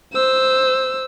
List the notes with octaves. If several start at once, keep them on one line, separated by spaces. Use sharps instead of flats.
C5 E6